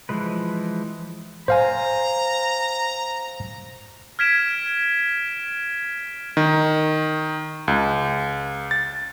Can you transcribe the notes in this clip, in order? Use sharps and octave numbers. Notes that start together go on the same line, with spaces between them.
E3 F3 G#3 B4
C5 F5 G#5 A#5
F6 G#6 B6 D7 E7
D#3
C#2
A6